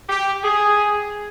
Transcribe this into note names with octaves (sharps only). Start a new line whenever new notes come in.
G4
G#4